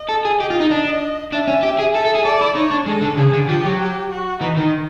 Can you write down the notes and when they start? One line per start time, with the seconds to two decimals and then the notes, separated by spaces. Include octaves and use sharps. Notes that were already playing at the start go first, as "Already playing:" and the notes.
Already playing: D#5
0.09 A4
0.25 G#4
0.40 G4 D#5
0.50 F4
0.60 D#4
0.71 D4
1.32 D4 E5
1.47 C#4
1.63 G4
1.79 G#4
1.94 A4 E5
2.05 A4
2.15 G#4
2.25 A4 D5
2.41 E4
2.56 D#4 C#5
2.72 D4
2.86 G#3 A4
3.02 D3
3.18 C#3 G#4
3.34 D3
3.49 F3 G4
3.65 F#3
3.80 G4
4.11 F#4
4.41 E3 D#4
4.57 D#3